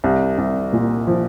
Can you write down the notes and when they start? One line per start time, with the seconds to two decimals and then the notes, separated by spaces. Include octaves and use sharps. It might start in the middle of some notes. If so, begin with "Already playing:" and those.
0.04 C2
0.38 C2
0.73 A#2
1.07 F3